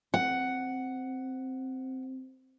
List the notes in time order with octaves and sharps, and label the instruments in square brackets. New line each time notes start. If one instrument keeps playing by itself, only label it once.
[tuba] C4 [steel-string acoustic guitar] F#5